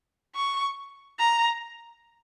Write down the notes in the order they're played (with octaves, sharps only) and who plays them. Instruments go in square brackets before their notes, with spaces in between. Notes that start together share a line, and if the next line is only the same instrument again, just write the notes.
[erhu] C#6
A#5